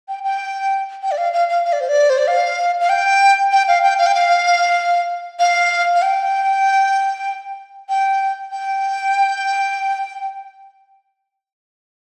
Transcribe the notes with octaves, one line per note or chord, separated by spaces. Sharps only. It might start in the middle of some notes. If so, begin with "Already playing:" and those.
G5
G5
G5
D5
F5
F5
F5
F5
D5
C5
D5
C5
D5
F5
F5
G5
G5
F5
G5
F5
G5
F5
F5
F5
G5
G5
G5